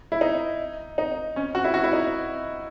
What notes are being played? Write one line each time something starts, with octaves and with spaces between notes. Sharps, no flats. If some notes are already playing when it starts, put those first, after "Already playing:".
E4
D#4
D#4
C#4
F#4
E4
F#4
E4
D#4